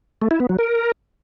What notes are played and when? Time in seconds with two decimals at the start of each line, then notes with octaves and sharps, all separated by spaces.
0.22 A3
0.31 E4
0.40 B3
0.49 F#3
0.58 A#4